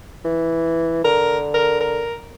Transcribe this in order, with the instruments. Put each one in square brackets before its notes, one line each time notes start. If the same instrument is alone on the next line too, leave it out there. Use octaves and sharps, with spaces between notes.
[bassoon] E3
[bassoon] D3 [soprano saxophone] A#4
[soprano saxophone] A#4
A#4